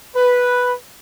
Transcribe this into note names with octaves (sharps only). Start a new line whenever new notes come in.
B4